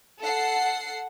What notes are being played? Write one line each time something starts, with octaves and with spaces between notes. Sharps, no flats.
A4 F#5 C7